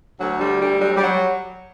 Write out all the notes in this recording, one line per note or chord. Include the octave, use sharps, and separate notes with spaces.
D2 F#3
D3 G3
D2 G3
F#3 G3
G3
F#3